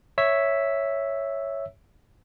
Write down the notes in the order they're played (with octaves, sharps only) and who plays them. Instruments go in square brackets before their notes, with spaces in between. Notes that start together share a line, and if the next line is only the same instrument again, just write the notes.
[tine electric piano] C#5 E5 E6 B6